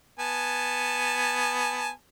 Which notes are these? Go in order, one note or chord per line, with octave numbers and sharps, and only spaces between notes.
B3 G#5 A5